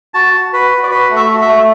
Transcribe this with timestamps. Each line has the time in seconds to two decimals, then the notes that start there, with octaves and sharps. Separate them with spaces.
0.14 F#4 A5
0.34 F#4
0.53 F#4 B4
0.71 F#4
0.83 D5
0.91 F#4 B4
1.10 A3
1.16 E5
1.29 F#4
1.41 E5
1.48 A3